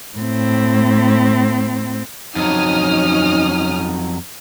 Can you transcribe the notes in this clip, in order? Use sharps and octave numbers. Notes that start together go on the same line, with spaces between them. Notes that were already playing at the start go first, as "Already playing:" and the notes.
A2 C4
F2 F#3 C#4 D#4 D#6 F6